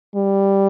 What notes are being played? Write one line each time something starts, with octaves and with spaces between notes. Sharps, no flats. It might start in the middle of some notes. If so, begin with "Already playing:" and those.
G3